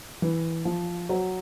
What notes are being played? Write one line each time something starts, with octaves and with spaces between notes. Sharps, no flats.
E3
F3
F#3